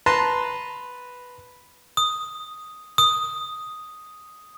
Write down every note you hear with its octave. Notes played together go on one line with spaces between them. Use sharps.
B4 A5 A#5 C6
D#6
D#6